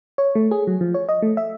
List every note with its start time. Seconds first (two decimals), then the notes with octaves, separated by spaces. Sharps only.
0.18 C#5
0.35 A3
0.51 G#4
0.67 F#3
0.81 F3
0.94 C#5
1.09 D#5
1.22 A3
1.37 E5